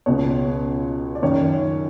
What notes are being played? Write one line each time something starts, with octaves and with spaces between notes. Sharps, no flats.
C#2 B2 C#5
D5
F#2 D#3 C#5